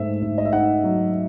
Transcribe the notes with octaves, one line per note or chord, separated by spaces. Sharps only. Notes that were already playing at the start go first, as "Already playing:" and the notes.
Already playing: G#2 A3 E5
G#2
D#5
E5
D#4 F#5
F#3